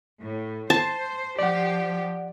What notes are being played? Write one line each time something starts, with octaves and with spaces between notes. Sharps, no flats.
A2
C5 A5
F3 G4 D5 F#5